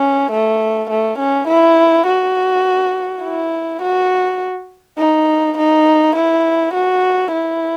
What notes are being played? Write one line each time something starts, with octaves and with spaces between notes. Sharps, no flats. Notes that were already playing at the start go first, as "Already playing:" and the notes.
Already playing: C#4
A3
A3
C#4
E4
F#4
E4
F#4
D#4
D#4
E4
F#4
E4